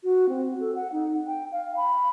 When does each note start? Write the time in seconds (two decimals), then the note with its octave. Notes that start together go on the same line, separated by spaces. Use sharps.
0.04 F#4
0.29 C4
0.60 A4
0.75 F#5
0.92 D#4
1.27 G5
1.52 F5
1.77 B5